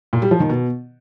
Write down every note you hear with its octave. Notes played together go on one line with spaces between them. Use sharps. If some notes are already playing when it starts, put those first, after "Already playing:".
A#2
G3
F3
D#3
B2